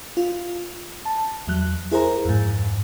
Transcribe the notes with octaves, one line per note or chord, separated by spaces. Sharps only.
F4
A5
E2 F#3 F#6
E4 G#4 A#4 C5 A#5
F2 G#2